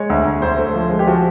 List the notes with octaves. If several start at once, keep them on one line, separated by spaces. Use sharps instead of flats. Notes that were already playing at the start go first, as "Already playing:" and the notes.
Already playing: G#3 C#5
D2
D2
D2 C5
A3
F3
G#3
G4
F3 F#4